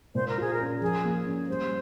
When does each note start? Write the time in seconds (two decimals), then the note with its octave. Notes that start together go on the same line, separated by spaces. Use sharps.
0.15 A#2 C5
0.29 A#4
0.38 F4 G#4
0.53 A#4
0.60 C#4
0.82 F3 G#4
1.04 A#3
1.26 C#4
1.49 G3 C5